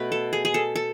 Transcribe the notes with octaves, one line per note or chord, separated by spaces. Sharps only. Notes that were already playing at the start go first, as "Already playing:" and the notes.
Already playing: B2 A3 B4
A4
G#4
G#4
A4
A4